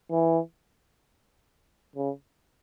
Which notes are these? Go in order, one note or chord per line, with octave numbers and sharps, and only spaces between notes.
E3
C#3